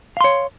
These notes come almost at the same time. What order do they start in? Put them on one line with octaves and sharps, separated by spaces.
F5 C6 C#5